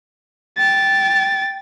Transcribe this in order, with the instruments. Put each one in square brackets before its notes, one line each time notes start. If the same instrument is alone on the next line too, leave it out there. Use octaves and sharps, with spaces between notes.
[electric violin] G5 A6